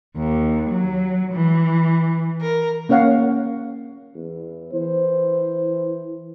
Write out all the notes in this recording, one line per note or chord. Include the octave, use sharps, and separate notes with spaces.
D#2
F#3
E3
A#4
A#3 C#4 C#5 F5 F#5
E2
E3 C5